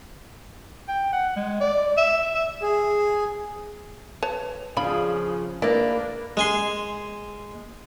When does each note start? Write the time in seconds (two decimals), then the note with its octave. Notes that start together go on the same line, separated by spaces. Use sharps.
0.88 G5
1.13 F#5
1.36 G#3
1.60 D5
1.97 E5
2.34 E5
2.62 G#4
4.23 B4 C#5 A5
4.77 C#3 F3 D4 F4 G#4 B5
5.62 A#3 D4 E4 B4 D5
6.37 G#3 G#5 C6